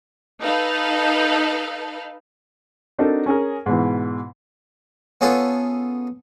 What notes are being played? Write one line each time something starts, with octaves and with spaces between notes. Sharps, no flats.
D#4 A4 B4 F5
C4 D4 D#4 F#4 A4 A#4
C#4 G#4 A#4
G#2 B2 E3
B3 C#4 F4 G#4 A4 B4